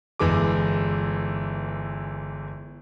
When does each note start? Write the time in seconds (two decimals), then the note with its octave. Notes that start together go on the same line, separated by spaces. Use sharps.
0.19 G1 E3 G#3 D6